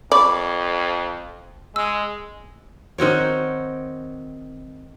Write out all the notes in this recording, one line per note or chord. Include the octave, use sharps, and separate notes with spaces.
F2 D5 B5 C#6
G#3 E6
D#3 C4 F#4 C#5